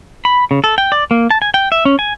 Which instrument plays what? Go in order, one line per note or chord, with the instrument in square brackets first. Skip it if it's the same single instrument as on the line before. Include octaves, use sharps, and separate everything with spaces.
[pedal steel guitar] B5
C#3
A4
G5
D5
A#3
A5
G#5
G5
E5
C#4
G#5